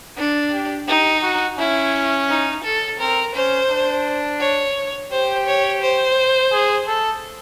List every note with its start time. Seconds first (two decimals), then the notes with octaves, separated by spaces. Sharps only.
0.17 D4
0.52 G4
0.88 D#4 G4
1.23 F#4
1.58 C#4 E4
2.29 D#4
2.64 A4
2.99 C4 A#4
3.35 C#4 C5
3.70 D4
4.40 C#5
5.11 G4 C5
5.47 C#5
5.82 C5
6.53 G#4
6.88 A4